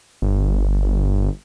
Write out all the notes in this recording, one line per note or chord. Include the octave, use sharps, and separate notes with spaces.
G1